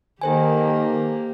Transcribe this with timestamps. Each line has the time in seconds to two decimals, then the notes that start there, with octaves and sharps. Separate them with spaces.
0.21 D#3 A#3 G4 A4 C5 G#5